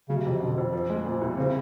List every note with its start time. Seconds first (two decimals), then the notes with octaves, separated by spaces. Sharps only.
0.09 C#3 F#3
0.17 C3
0.25 F2 B2
0.33 C3
0.41 B2 D3
0.58 F2
0.73 F3
0.90 G#3
1.06 A#2
1.21 C2
1.37 C#3 C4